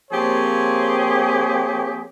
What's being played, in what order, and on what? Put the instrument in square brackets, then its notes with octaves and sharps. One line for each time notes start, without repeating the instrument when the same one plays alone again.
[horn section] F3 A#3 C4 G4 G#4 C#5